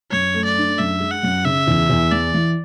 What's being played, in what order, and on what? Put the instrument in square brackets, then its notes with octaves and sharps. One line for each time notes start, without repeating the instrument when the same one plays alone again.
[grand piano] F#2 [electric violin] C#5
[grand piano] A3
[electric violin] D5
[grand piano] D4
[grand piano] F#2 [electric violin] E5
[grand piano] G#3
[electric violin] F#5
[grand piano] F#2
[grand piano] C#3 [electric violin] E5
[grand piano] E2
E2
[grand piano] E3 [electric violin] D5
[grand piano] E3